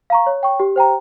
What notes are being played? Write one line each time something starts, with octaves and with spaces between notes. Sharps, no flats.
F5 A#5 C#6
C#5
G5 C#6
G4
C5 G5 A#5